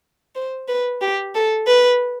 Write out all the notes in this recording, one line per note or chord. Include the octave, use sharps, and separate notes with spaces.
C5
B4
G4
A4
B4